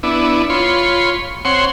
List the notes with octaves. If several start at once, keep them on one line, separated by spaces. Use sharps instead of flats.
B3 D4 E4
F4 C#5 B5 C6
C4 C#5 F#5 C6